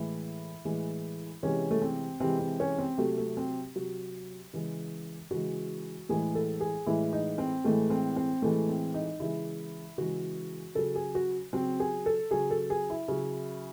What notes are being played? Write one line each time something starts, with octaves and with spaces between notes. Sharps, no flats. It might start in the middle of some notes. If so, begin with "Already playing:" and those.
Already playing: A2 E3 G#3 E4
A2 E3 G#3
C3 E3 G#3 C#4
A3
C4
C3 E3 G#3 C4
C4
C#4
C4
C3 F#3 A3
A3
C4
C3 F#3
C#3 E3 G#3
C#3 E3 G#3 F#4
A2 E3 G#3 G#4
A4
G#4
A2 E3 G#3 E4
D#4
C4
A2 E3 G#3 A3
C4
C4
A2 E3 G#3 A3
C4
D#4
C#3 E3 G#3 E4
C#3 E3 G#3 F#4
C#3 F#3 A4
G#4
F#4
C#3 F#3 C4
G#4
A4
C#3 F#3 G#4
A4
G#4
E4
C#3 F#3